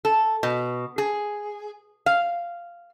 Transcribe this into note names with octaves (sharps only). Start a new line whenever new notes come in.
A4
B2
G#4
F5